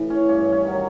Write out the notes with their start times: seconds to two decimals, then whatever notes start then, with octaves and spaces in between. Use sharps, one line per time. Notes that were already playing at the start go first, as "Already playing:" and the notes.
Already playing: A2 E3
0.10 C#4
0.29 G2 C#4
0.52 C#4
0.64 D#3 F#3